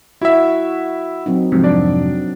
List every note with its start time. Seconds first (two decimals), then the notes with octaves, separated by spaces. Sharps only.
0.22 E4 F#4 E5
1.26 F#3 C4 D#4
1.52 F2 G#2 C3
1.64 D4 D5